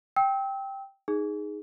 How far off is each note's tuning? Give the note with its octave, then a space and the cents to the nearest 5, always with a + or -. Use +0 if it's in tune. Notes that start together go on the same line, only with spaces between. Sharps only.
G5 +0 E6 -35
D#4 +0 G#4 +0